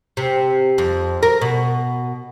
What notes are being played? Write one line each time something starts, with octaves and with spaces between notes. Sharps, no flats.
C3
F2
A#4
B2